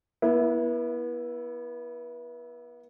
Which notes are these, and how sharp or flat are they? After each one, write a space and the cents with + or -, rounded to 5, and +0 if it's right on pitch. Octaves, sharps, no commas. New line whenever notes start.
B3 -35 E4 +0